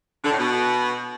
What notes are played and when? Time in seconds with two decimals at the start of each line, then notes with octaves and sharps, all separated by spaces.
0.24 D3
0.32 A2
0.39 B2